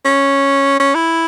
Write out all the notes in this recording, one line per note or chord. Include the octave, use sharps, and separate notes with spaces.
C#4
C#4
E4